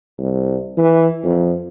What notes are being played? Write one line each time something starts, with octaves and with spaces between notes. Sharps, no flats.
C2
E3
F2